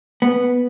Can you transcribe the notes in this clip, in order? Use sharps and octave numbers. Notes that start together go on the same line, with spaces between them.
B3